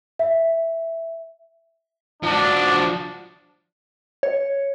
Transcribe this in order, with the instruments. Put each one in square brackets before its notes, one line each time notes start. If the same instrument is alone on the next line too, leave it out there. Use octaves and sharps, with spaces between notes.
[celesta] E5
[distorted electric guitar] F3 F#4 [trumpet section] D4
[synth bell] C#5